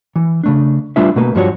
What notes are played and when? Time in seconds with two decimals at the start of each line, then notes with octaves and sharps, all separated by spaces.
0.16 E3
0.43 C#3 A3 D4
0.96 G3 A3 D4 F4 B4 E5
1.16 B2 A3 A#3 B4
1.35 G2 F3 G3 F#4 C#5